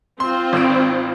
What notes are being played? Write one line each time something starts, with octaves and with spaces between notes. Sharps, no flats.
C4 F4 C6
G#1 E6 D7